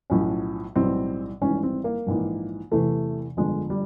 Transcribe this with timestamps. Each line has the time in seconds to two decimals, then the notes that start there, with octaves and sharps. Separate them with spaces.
0.10 B1 A2 F3 C#4
0.75 B1 A2 E3 G3 C4
1.41 G#1 G#2 E3 G3 C#4
1.63 C4
1.84 A#3
2.07 A#1 G#2 E3
2.72 E2 C3 E3 A3
3.37 G1 F2 D3 G#3
3.70 G3